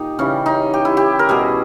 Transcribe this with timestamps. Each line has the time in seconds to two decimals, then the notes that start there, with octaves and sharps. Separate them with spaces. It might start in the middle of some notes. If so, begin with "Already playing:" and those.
Already playing: A#2 D#4 G4
0.19 C#3 E3 G3 C#4
0.46 D#4
0.74 G4
0.85 E4
0.97 G4
1.19 A#4
1.29 B2 G3 G#4